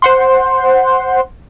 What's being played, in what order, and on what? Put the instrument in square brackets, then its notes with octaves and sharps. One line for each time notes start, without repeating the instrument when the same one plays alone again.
[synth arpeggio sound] C5 F#5 C6